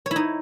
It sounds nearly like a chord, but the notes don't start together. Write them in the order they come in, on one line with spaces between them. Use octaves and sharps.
C#5 E4 D#4